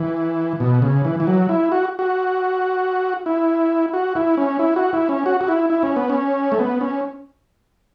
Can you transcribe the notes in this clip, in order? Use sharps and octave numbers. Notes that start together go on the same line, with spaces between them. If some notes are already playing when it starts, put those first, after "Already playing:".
Already playing: E3
B2
C#3
E3
E3
F#3
E4
F#4
F#4
E4
F#4
E4
C#4
E4
F#4
E4
C#4
F#4
F#4
E4
E4
C#4
B3
C#4
A3
B3
C#4